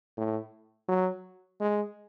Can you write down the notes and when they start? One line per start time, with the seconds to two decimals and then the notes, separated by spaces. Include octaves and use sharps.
0.17 A2
0.88 F#3
1.60 G#3